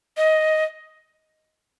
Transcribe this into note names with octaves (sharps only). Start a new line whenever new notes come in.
D#5